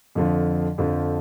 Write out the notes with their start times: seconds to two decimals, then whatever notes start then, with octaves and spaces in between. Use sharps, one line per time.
0.15 F2 D3 F3
0.78 F2 D3 F3